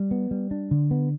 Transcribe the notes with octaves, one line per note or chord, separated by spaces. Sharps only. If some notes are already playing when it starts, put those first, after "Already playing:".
Already playing: G3
B3
G3
D4
D3
B3